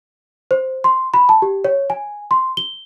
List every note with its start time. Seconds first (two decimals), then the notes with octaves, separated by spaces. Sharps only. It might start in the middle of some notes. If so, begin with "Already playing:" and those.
0.51 C5
0.84 C6
1.14 B5
1.29 A5
1.42 G4
1.64 C#5
1.90 G#5
2.31 C6
2.57 G7